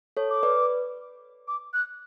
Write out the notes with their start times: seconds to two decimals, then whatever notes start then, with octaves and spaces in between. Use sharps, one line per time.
0.17 A4 C#5
0.30 D6
0.43 B4 D5
1.48 D6
1.73 F#6